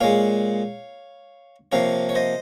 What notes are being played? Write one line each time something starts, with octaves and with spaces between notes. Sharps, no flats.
A#2 G#3 C#5 F5
C3 F3 A#3 C#5 F5
C#5
C5 D#5